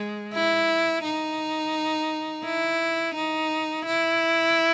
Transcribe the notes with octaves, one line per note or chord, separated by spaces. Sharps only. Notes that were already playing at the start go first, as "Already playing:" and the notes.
Already playing: G#3
E4
D#4
E4
D#4
E4